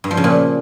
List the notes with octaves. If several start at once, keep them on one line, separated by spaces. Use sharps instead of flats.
G2
F3
C#3
A#2